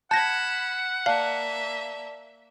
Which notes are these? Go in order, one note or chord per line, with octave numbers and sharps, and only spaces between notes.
F#5 A5 B5 G6 G#6 A#6 E7
A#3 D5 E5 F5 A5